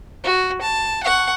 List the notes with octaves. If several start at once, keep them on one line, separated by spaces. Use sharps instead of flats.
F#4
A5
F#5 C#6